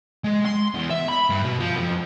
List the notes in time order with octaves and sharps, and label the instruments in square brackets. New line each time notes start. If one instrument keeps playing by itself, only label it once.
[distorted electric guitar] G#3
C6
E2
E5
B5
G2
B2
F3
F2